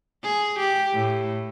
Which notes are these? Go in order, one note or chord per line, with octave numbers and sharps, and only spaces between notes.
G#4
G4
A2